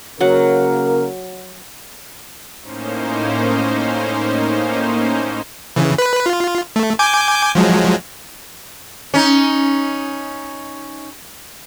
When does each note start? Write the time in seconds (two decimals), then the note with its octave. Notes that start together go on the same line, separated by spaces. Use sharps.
0.21 C#3 F#3 A#3 A#4 F#5
2.61 A2 A#3 C#4 D#4 C5
5.76 C#3 E3
5.98 B4
6.26 F4
6.76 A3
6.99 G#5 D6 G6
7.55 F3 F#3 G#3
9.14 C#4 D#4